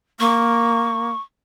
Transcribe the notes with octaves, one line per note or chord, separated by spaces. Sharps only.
A#3 C#6